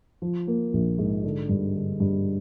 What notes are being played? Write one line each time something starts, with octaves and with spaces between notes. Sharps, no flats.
F3
A#3
A#1
G#2
D3
G2
D3
G2